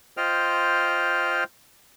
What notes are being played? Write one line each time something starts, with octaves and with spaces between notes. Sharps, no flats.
F4 C5 D#5 G5 F6